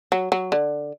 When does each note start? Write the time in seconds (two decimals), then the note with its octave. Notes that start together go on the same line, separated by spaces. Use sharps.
0.12 F#3
0.32 F#3
0.52 D3